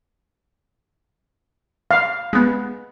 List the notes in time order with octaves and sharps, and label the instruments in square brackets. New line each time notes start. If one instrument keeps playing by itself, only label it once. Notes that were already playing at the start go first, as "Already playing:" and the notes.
[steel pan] F5
[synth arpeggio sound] G#3 B3